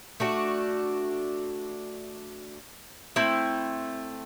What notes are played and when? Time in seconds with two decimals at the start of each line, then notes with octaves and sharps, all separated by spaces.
0.20 A3 D4 F#4
3.16 A3 C4 E4